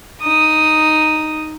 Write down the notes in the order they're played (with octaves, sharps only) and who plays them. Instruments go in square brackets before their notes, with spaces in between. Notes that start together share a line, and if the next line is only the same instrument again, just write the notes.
[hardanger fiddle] D#4 D#6